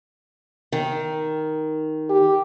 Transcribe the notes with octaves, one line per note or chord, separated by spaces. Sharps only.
D#3
G4